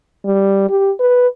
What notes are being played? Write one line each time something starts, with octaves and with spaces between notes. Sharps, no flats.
G3
G4
B4